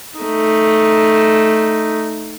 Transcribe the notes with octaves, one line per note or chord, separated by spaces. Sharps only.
A3 D#4